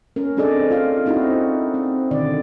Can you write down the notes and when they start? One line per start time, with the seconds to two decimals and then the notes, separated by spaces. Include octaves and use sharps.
0.16 C#4 A#4
0.37 C4 D4 G#4 A4 D5 D#5
0.71 F4 F5
1.06 C4 D#4 E4 F#4
1.74 C4
2.11 B2 D3 D#3 D5